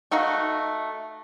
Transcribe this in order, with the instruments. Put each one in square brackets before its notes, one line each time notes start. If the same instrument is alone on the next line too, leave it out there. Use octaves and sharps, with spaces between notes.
[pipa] A3 D#4 F#4 F5